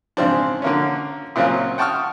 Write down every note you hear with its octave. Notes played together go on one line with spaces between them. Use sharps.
G#2 C#3 C4 D4
D3 A#3 C#4
A#2 C#3 F#3 C4 C#4 F4
F#5 G5 A5 C#6 D#6 F6